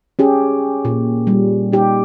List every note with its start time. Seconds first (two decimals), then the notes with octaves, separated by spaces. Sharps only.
0.19 C#4 G4 G#4
0.85 A#2
1.27 G3
1.72 D#4 G4